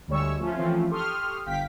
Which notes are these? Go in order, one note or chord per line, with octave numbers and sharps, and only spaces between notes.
D2 G3 G#3 C#5 C#6 E6
F3 A3 C#4 F4
E3 F3 A3 C4 C#4 F4
G4 A4 C6 C#6 D#6 F6
G1 F5 G5 B6